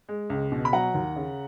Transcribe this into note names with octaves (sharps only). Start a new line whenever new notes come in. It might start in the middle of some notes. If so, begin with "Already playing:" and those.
G#3
C#2
B2
B5
F#3 F#5 A#5
D#2
C#3